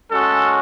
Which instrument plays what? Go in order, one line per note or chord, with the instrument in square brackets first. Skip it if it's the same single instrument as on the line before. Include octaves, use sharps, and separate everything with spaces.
[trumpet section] G#3 C#4 F#4 A4